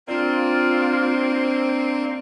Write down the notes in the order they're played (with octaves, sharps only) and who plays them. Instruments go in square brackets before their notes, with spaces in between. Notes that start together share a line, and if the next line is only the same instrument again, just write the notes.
[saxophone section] A#3 C4 [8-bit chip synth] D4 D5 [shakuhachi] F4